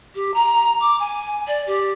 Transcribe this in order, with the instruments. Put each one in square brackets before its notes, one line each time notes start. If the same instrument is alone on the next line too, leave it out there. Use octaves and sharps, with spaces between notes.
[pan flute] G4
A#5
D6
G#5
D5
G4